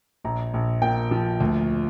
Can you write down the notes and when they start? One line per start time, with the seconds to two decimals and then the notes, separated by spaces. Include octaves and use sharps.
0.24 A#1 A#5
0.54 A#1
0.82 A#2 G5
1.11 F3
1.40 D2